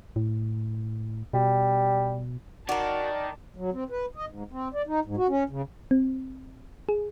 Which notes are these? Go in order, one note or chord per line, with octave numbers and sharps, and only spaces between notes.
A2
B2 G3
D#3 F#4 A#4 D5 A5
F#3
C4
B4
D#5
G#2
C4
D5
D#4
G#2
F#4
C#4
C#3
C4
G#4